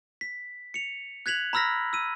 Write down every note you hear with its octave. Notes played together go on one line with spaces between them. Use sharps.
B6
C#7 F7
F#6 G#6 B6 F7 F#7
A#5 B5 E6 F6 A#6 B6
E6 D#7